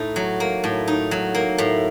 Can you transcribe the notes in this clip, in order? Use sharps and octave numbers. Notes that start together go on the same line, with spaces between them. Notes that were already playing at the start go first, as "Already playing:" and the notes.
Already playing: A2 D#4
F#3
A#3
A2
D#4
F#3
A#3
A2